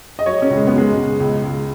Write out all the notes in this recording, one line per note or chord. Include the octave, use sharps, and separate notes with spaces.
D#5
F#3 C#5
C#4
C#2
G#3
B3
F#3 G#3
C#3
C#2
C#2